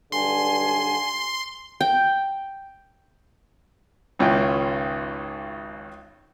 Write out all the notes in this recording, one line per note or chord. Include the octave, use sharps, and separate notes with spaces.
B1 G2 D3 G#5 C6
G5
G#1 C#2 C#4 E4 F4 G5